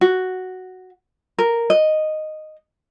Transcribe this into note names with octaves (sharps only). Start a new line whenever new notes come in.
F#4
A#4
D#5